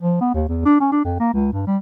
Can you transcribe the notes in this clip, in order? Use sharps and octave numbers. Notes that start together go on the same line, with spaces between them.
F3
B3
D#2
E2
D4
C#4
D4
F2
A#3
C#2
G2
G3